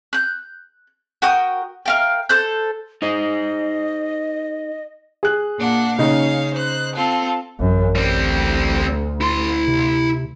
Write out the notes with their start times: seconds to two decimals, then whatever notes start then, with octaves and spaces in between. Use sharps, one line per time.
0.13 F#6 G6
1.22 F#4 A#4 G5 D#6
1.86 A#4 F5 G5
2.29 A4 C5 F#6 G6
3.02 D#4 G#4 C5 D#5
5.23 G#4 F#6
5.58 A#2 D4 F#5
5.98 C#3 C#4 D#4 F5
6.54 C5 F#6
6.95 C4 F4 A4
7.60 A1 F#2
7.96 D2 G3 C4
9.21 E4 C6
9.68 C3